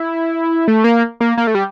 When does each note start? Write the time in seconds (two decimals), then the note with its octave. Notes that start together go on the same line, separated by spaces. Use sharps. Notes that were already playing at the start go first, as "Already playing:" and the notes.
Already playing: E4
0.68 A3
0.84 A#3
1.21 A#3
1.38 A#3
1.47 A3
1.55 G3